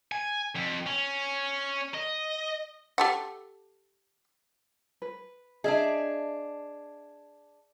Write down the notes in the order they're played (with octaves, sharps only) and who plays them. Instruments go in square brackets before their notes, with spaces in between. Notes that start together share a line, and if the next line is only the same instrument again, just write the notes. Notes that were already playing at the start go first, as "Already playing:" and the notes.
[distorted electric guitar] G#5
F2
C#4
D#5
[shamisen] G4 A4 F#5
[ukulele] B4
[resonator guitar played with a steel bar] D4 G#4 [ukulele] D#5 E5